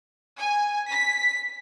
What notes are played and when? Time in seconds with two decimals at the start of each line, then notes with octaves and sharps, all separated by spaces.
0.38 G#5
0.90 B6